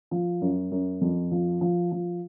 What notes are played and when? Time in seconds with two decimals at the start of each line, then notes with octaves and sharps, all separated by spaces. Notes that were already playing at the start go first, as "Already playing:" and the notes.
0.11 F3
0.41 F#2
0.71 F#2
1.01 F2
1.31 F3
1.61 F3
1.92 F3